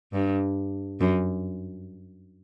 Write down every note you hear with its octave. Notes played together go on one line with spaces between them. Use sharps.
G2
F#2